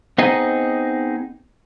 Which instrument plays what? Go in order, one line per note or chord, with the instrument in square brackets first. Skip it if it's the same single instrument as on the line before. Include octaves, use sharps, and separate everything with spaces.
[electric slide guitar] B3 C4 D#4 G#4 D#5